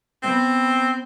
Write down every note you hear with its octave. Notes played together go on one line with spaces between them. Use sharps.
B3 C4